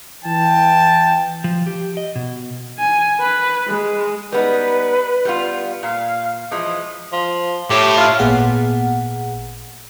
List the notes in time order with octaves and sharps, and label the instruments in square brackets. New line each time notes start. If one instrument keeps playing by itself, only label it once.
[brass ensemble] E3 G5 [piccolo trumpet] A5
[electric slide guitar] F3
G4
D#5
B2
[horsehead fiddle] G#5
B4
G#3
[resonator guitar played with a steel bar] G3 B3 D#4 [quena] B4
[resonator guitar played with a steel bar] G3 B3 F4
[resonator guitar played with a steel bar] A#2 [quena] F5
[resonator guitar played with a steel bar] E3 F3 G#3 [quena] D#6
[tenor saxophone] F3
[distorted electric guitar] A2 [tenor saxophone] G4
[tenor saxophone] F4 [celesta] E5 F6
[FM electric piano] G#1 A#2 B3 G#4 F#5